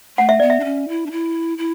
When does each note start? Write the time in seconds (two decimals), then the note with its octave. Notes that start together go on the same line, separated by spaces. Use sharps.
0.18 A3 F#5
0.29 E5
0.40 B3 D5
0.50 E5
0.60 D4
0.64 C#4
0.88 E4
1.06 D4
1.12 E4
1.58 E4